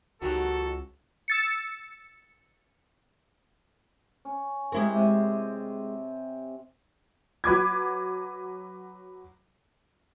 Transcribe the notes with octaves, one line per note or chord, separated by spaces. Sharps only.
C#2 D#3 F#3 F#4 G4 A4
E6 A6 C#7
C#4
G#3 C4 E4 G4 A#4
C3
F#3 B4 D6 G#6